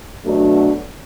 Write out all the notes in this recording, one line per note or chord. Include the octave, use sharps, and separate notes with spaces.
B2 F#3 A3 D4